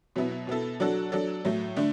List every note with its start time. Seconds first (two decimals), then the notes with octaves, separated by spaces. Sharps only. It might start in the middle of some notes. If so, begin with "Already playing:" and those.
0.16 B2 F#3 B3 E4
0.47 B2 B3 E4 A4
0.80 F#3 D4 F#4 A4
1.12 F#3 D4 A4
1.45 A2 F#3 A3
1.76 D3 A3 D4